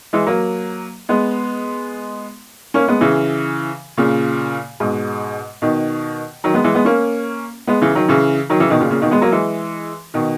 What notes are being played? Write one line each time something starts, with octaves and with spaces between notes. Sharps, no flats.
E3 G#3
F#3 A#3
G#3 B3
A#3 C#4
G#3 B3
C#3 E3
A#2 C#3
G#2 B2
B2 D#3
D#3 F#3
G#3 B3
E3 G#3
G#3 B3
A#3 C#4
G#3 B3
C#3 E3
D#3 F#3
C#3 E3
D#3 F#3
C#3 E3
B2 D#3
A#2 C#3
A#2 C#3
B2 D#3
G#3 B3
F#3 A#3
E3 G#3
B2 D#3